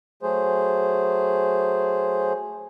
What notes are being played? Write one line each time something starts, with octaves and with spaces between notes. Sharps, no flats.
F#3 A3 G#4 C5